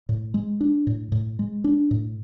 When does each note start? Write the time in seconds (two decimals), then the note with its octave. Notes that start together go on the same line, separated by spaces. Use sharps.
0.09 A2
0.34 G#3
0.61 D4
0.87 A2
1.12 A2
1.39 G#3
1.64 D4
1.91 A2